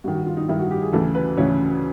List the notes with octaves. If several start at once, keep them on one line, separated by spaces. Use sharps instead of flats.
G2 D#3 F#4
F#4
F4
D#4
G2 D#3 E4
F#4
G4
G#4
D2 C#3 E3 A4
B4
D2 C#3 E3 C#5